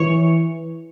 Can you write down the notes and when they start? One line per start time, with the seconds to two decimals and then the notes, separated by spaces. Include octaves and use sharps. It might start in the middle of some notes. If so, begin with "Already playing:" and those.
Already playing: E3 C#5